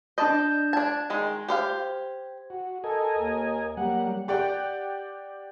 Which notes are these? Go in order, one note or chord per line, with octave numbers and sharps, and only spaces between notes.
D4 D5 D#5 A5 G6
D4 A5 G#6
D#3 G#3
G4 C5 F5
F#4
A4 A#4 D#5 G#5
D#2
F#3 G3 A#3 F#5
G4 D5 F#5 G5